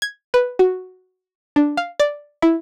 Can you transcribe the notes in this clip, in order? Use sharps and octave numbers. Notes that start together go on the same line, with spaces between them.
G#6
B4
F#4
D4
F5
D5
E4